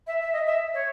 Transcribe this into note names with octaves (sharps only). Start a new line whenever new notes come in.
E5
E5
D#5
E5
C#5